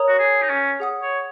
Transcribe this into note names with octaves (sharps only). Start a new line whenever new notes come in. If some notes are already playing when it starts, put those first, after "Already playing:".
Already playing: A#4 C#5 A#5 D#6
F#4
G#4
D#4
C#4
G#4 F#5 D#6
C#5